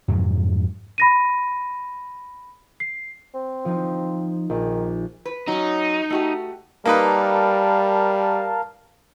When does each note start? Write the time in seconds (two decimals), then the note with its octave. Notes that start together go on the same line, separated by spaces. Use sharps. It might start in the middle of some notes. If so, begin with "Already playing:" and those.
0.08 F2 G#2 C3 F#3
0.98 B5 A#6 D#7
2.80 C7
3.34 C4
3.65 F3 D#4
4.50 A#1 D#3
5.25 B4
5.48 F#3 C#4 D#4
6.10 A3 F#4 G4
6.85 G3 A#3 D#4 A#4 B4 F5 A5